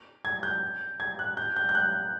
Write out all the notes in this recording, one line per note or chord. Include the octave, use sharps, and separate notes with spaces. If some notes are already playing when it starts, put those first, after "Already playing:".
G#6
G6
G#6
F#6
G6
G6
G6
F#6